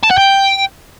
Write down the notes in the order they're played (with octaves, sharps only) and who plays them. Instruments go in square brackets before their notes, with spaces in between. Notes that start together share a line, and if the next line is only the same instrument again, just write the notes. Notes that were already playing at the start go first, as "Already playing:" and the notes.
[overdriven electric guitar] A5
F#5
G5